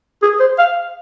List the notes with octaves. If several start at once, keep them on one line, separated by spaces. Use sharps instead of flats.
G#4
C5
F5